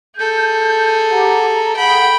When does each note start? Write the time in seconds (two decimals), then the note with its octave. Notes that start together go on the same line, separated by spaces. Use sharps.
0.17 G#4 A4 G6
1.11 G4 F#5 A#5
1.43 A#5
1.77 G#4 F#5 G5 B5